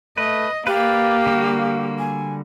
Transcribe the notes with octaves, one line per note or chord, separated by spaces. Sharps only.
A3 B4 D#5
A#3 G4 B4 D5 F5
D3 G3 F#4
G#5